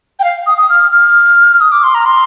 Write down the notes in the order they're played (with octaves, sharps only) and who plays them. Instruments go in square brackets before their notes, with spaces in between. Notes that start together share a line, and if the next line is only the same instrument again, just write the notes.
[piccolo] G5
F5
D#6
D#6
F6
F6
D#6
D6
C6
A#5
C6